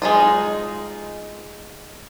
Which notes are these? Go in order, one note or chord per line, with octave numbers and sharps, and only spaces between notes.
G#3 D#4 F4